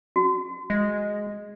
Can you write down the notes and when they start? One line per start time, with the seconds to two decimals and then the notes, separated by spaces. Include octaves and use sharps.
0.16 F#4
0.70 G#3